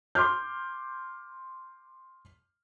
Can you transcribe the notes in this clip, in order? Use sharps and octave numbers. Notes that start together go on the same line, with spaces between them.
C6 D6 F6 G6